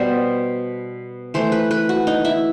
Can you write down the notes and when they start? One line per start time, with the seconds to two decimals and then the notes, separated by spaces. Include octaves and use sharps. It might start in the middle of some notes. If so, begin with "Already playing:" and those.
Already playing: B2 G3 B3 C5
1.34 E3 A3 C5
1.52 B4
1.71 B4
1.89 F#4
2.07 D#4
2.25 E4